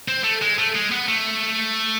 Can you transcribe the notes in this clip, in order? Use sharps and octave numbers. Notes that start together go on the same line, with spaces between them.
C4
A3
G#3
A3
G#3
B3
A3